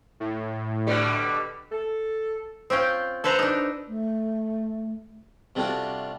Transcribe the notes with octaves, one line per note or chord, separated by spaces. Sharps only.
A2
B2 D3 G3
A4
C4 C#4 F4 G5
A4 B4 C5 A5 A#5
D4 D#4
A3
C3 G3 A3 D4 F4 F#4